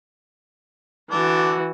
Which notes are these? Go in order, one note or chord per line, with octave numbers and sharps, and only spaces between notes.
D3 E3 D4 F#4